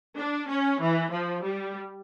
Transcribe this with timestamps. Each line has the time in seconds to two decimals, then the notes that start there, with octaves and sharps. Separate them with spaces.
0.17 D4
0.48 C#4
0.80 E3
1.11 F3
1.43 G3